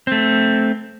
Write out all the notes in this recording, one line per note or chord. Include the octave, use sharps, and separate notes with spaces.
A3 C4